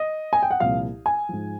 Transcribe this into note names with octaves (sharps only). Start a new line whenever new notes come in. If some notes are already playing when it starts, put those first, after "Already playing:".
Already playing: D#5
G#5
G5
F#5
C2 A#2 F3 F5
G#5
G#2 F3